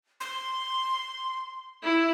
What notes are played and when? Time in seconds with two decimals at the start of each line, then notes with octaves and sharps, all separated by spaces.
0.20 C6
1.83 E4